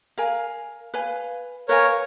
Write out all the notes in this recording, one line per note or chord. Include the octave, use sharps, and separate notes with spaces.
A#4 F5 G#5
B4 F5 G#5
A#4 B4 C#5 F5 G#5